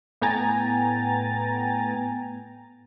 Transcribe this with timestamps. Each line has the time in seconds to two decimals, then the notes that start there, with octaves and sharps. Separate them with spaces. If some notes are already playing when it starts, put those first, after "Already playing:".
0.21 A2 B3 G5 G#5 A#5 A6